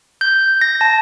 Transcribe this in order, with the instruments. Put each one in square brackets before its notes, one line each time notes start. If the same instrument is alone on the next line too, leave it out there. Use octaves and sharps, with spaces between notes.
[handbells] G6
A#6
A5